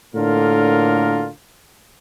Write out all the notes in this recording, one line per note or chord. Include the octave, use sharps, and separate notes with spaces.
A2 D3 A#3 D4 F4 A#4